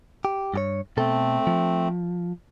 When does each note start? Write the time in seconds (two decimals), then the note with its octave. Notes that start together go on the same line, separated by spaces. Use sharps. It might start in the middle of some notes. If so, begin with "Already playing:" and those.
0.25 G4
0.54 G2 G4 C#5
0.97 B2 A3 C4 A4
1.47 F3